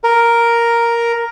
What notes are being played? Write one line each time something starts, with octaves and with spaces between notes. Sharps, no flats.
A#4